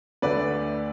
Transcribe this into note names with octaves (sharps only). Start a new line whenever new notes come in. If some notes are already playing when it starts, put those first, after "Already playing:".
D2 D3 A3 D4 B4 D5